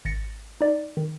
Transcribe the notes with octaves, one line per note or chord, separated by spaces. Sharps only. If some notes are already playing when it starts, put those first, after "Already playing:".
G#1 A6 A#6 C#7
D#4 D5
D#3